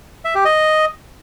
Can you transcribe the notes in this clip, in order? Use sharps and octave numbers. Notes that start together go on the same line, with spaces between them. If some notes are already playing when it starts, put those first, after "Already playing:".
E5
G4
D#5